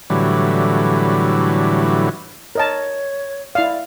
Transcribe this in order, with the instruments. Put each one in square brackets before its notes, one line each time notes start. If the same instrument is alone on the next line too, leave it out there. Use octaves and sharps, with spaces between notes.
[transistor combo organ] A2 D3 E3 F#3 G3
[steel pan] A#4 D#5 A5 [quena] C#5
[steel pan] E4 F5 [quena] D5